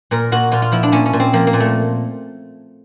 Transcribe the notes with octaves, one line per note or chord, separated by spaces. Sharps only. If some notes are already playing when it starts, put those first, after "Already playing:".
A#2 A#4
A#2 F#4
A#2 F4
F4
F3 E4
D4
A#2 C#4
C#4
A#2
C4
F3 A#3
A#3
A#2
A3